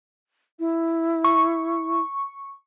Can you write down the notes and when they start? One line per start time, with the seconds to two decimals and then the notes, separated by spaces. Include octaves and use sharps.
0.59 E4
1.24 C#6